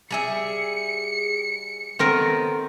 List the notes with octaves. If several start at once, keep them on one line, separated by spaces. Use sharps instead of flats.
G3 G#4 E5 C#7
D#3 B3 C4 A4 A#4